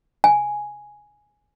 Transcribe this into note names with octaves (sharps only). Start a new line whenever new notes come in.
G#5